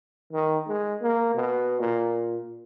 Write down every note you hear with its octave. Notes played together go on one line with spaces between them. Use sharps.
D#3
G#3
A#3
B2
A#2